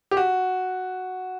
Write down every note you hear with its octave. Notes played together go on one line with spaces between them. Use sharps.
G4
F#4